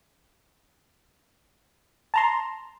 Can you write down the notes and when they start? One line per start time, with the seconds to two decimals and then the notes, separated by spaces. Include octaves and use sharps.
2.14 A5 A#5 C6